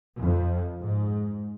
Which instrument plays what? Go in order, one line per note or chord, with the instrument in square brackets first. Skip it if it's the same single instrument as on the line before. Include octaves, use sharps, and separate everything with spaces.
[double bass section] F2
G#2